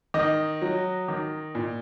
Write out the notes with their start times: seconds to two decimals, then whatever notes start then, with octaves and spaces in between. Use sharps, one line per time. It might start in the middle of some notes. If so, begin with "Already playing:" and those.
0.14 D#3 D#5
0.62 F#3
1.08 D#3
1.55 A#2